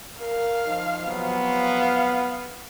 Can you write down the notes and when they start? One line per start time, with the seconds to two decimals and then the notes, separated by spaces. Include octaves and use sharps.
0.21 A#4 F5
0.66 F3 D#4
1.08 C3 F3 F#3 B3
1.47 F5